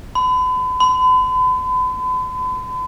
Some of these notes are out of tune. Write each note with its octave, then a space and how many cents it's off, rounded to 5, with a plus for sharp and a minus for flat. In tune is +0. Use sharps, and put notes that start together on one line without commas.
B5 +40
B5 +45